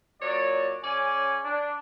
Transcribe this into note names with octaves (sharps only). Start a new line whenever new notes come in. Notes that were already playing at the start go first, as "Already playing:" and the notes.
A#2 F#3 C#5 D5
C#3 C#4 D5 G#5
D4